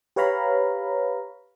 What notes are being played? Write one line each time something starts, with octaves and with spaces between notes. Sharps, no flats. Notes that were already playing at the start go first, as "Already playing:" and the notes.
G4 B4 C#5 F5 A#5 B5